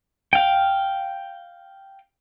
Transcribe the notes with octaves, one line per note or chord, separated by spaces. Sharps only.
F5 G5